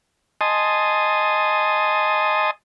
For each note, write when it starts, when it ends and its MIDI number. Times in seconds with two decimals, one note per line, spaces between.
0.41 2.51 75
0.41 2.51 80
0.41 2.51 81
0.41 2.51 84
0.41 2.51 87